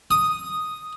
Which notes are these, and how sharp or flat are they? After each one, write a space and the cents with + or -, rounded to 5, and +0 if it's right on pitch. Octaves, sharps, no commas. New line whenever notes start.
D#6 +0